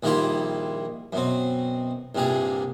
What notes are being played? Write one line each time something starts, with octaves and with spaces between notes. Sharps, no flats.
A#1 D#3 G3 A#3 E4 C6
F#2 B2 C4
C2 G2 A#2 G3 G#4